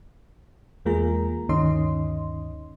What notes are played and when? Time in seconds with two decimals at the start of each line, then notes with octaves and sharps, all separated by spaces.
0.85 E2 G#3 A#3 F4 G#4 A#5
1.49 D2 G2 D#3 C#4 D#5 C6